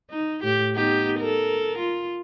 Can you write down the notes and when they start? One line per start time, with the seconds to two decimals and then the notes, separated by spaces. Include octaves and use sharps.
0.10 D#4
0.43 A2 G4
0.75 B3 D#4 G4
1.20 A4 A#4
1.79 F4